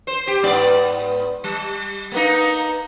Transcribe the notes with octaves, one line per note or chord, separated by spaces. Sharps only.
C5
G4
G#2 B3 D5
G3
A#3 B3 D#4